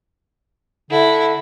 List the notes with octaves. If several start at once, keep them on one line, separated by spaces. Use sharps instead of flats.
D3 E4